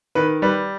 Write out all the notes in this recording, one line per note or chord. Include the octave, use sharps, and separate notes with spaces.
D#3 B4
G3 B4